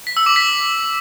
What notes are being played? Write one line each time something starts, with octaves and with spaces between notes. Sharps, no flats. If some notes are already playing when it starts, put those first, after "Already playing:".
B6
E6
D6
B6